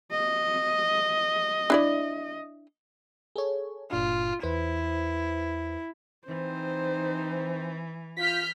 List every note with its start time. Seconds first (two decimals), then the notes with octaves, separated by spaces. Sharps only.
0.11 D#5
1.70 D4 E4 D5
3.36 G#4 A4 C#5
3.91 G1 A#2 D4 F4
4.43 E2 E4 B4 C5
6.27 E3 C4 D#4 C5
8.17 F4 F6 G6 B6